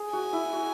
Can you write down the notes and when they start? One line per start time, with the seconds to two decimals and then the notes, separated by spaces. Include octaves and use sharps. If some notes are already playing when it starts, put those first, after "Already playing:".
Already playing: G#4
0.13 F#4 G#5
0.33 E4
0.53 F#4